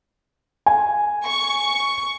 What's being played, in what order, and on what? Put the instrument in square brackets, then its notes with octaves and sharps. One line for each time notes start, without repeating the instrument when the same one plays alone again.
[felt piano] G#5
[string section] C#6